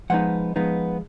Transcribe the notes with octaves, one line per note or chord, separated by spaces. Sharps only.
F3 G#3 B3 D#4 F#5
F3 G#3 B3 D#4